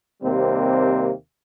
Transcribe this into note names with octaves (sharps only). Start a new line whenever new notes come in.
D#2 C3 G3 A#3 C4